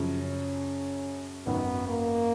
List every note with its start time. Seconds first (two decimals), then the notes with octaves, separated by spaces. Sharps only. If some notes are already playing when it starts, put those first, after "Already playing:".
Already playing: F#2 C#3 F3
0.21 C#4
1.46 G#1 F#2 D#3 B3
1.89 A#3